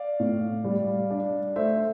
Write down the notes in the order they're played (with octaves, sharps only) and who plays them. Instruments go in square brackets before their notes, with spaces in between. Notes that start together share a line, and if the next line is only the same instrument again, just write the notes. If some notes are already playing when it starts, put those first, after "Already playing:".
Already playing: [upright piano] D5 F5
A2
G3
D4
A3 C5 E5